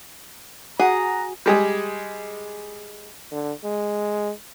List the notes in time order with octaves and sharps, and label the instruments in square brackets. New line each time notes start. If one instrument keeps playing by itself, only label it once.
[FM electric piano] F#4 [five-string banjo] G#4 [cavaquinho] F#5 [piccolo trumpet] A#5
[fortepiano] G3 G#3 G#4
[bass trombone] D3
G#3